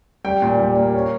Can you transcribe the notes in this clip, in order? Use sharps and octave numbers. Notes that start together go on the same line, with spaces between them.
G3 G5
A#2
G3
A#3
C#4